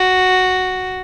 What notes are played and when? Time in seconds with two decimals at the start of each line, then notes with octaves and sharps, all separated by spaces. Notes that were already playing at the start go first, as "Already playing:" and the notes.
Already playing: F#4